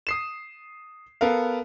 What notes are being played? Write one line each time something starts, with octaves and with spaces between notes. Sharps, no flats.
D#6 C7 E7
B3 A4 A#4 F5